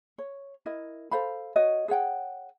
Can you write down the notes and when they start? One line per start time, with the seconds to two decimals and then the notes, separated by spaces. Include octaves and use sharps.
0.18 C#5
0.66 E4 A#4 D#5
1.11 A4 C5 F5 B5
1.56 F#4 C#5 D#5
1.88 G#4 C#5 F#5 G5